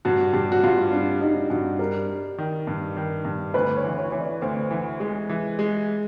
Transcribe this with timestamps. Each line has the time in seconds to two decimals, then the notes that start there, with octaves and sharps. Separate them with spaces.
0.05 G2 F#4
0.33 G2 G4
0.52 F#4
0.63 G2 F4
0.93 G3 D4
1.21 G3 D#4
1.50 G2 F#4
1.79 G3 A#4
2.09 G3
2.38 D#3
2.67 G2
2.97 D#3
3.25 G2
3.54 D2 B4
3.76 C#5
3.84 E3
3.98 C#5
4.10 E3 C#5
4.20 D5
4.41 D2 C5
4.71 E3
5.00 G#3
5.29 E3
5.59 G#3